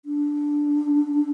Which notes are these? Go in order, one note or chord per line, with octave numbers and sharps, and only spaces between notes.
D4